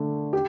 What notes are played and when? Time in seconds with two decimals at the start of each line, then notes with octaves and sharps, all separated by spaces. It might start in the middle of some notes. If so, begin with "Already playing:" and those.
Already playing: D3 A3
0.33 G4